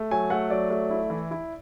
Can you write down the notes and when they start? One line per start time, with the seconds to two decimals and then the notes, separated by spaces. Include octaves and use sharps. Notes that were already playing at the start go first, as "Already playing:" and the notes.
Already playing: A3
0.11 F#3 G#5
0.30 A3 F#5
0.50 F#3 D5
0.70 A3
0.90 E4
1.10 E3
1.31 E4